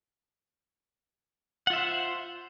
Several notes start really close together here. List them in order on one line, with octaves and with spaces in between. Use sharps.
F#5 F4 E5 C5